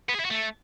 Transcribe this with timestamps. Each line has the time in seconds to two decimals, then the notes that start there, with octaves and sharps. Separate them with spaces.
0.09 B3
0.14 G#4
0.20 E4
0.25 F#4
0.30 A3